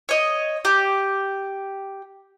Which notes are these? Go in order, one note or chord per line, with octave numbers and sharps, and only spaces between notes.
C#5 D#5
G4